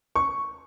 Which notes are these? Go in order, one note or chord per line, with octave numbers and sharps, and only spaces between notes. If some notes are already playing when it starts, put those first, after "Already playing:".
C#6